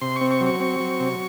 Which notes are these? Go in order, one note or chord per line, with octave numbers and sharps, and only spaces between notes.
C3 C6
C#6
C4
C#6
F#3
C#6
C4
F#3
C3